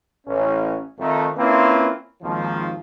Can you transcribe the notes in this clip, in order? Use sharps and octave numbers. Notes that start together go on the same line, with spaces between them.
A1 C#4
F2 D#3 A3
A#3 C4 C#4 E4 F4 B4
G#1 D#2 D#3 F3